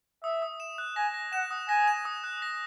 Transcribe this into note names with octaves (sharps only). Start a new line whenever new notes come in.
E5 D#6
D#6
E7
F#6
G#5 A#6
A#6
F#5 E7
D#6
G#5 A#6
E7
D#6
F#6
A#6